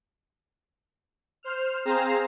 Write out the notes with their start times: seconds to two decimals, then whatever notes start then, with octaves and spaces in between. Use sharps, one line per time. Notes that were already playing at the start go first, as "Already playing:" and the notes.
1.43 C5 F6
1.85 C4 G#4 C5 F5 A#5